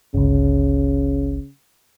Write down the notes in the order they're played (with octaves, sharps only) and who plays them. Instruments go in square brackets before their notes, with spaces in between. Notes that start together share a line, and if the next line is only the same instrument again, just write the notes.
[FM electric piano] G1 C#2 [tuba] C#3